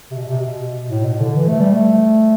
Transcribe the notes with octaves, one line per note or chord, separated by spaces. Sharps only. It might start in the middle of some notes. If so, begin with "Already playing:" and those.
C3
B2
C3
B2
A2
B2
D3
E3
A3
G3
A3